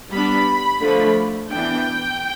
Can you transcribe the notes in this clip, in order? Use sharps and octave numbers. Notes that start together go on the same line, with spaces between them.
G3 B3 D4 B5
D3 F3 A3
E3 B3 D4 G5